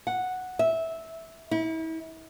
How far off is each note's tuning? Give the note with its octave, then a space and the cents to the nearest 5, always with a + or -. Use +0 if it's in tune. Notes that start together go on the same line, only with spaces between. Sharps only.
F#5 -5
E5 -10
E4 -35